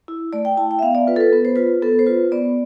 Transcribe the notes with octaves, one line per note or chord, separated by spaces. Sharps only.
E4
A3 D5
G5
E4 A5
G5
E5
B3 F5
D5
F4 B4
A4
B4
B3 B4
C5
F4 B4
B3 A4
C5
F4 B4
B3 D5